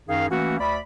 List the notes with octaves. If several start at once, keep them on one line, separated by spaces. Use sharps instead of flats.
F#2 D#3 D#4 G#4 F5
E3 A3 A#3 C#4 F#4
D2 D5 B5